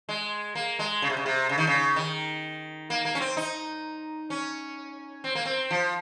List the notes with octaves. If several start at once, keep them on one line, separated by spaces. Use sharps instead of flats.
G#3
A#3
G#3
C#3
C3
C#3
C3
C#3
D#3
C#3
D#3
A#3
A#3
C#4
C4
D#4
C#4
C4
A#3
C4
F3